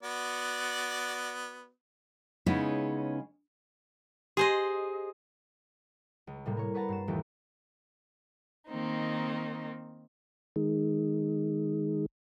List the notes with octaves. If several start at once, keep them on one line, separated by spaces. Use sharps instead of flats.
B3 F#4 D5
C#3 G#3 B3 C#4 D#4 E4
G4 G#4 C5 D#5
C#2
A2 C3 G3 A#3
A#4 C#5
B4 C#5 F#5 A5 A#5
G2 C7 E7
D#1 D#2 E3 A3 E4 G4
D#3 A#3 C4 D#4
D#3 G#3